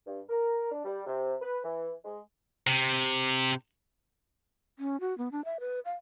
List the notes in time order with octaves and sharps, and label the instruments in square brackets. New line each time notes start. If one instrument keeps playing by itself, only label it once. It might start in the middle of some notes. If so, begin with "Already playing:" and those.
[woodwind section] G2
A#4
D4
G3
C3
B4
E3
G#3
[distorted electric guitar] C3
[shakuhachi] C#4
F#4
B3
D4
E5
B4
F5